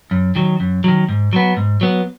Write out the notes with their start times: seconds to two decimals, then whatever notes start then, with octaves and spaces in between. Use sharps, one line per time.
0.11 F#2
0.36 D#3 F#3
0.60 F#2
0.84 D#3 F#3
1.09 G#2
1.33 F#3 B3
1.57 G#2
1.81 F#3 B3